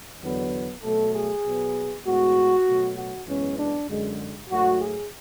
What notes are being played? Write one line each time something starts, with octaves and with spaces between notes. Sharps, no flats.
E2 D3 F#3 B3
B2 F#3 A3 A4
G#4
B2 F#3 B3
A2 G#3 B3 F#4
B2 F#3 A3
F#4
F#2 E3 G#3 B3 C#4
D4
F#2 D3 G#3
G#2 F#3 A3 F#4
G#4